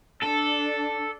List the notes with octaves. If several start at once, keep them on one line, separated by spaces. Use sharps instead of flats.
D4 A4